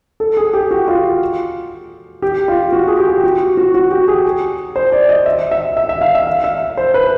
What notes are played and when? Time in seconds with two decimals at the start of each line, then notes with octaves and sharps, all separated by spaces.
0.20 A4
0.37 G#4
0.53 G4
0.71 F#4
0.88 F4
2.22 G4
2.48 F4
2.73 F#4
2.88 G#4
2.98 G4
3.24 F#4
3.57 F#4
3.74 F#4
3.91 G4
4.08 G#4
4.76 C5
4.92 D5
5.09 D#5
5.26 E5
5.51 E5
5.77 E5
5.89 E5
6.01 F5
6.15 E5
6.27 F5
6.44 E5
6.77 C5
6.94 B4